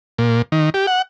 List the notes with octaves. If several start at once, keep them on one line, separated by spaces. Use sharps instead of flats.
A#2
D#3
G4
F#5